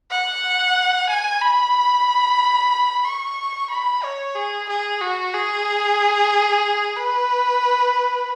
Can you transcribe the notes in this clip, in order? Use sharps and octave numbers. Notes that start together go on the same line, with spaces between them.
F#5
G#5
B5
C#6
B5
C#5
G#4
G#4
F#4
G#4
B4